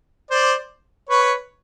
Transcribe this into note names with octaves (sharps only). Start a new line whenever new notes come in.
C5 D5
B4 C#5